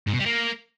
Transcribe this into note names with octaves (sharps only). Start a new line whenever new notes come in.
G#2
B2
G3
A#3